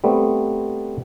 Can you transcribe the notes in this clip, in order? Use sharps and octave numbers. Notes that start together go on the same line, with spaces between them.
G3 A3 B3 C4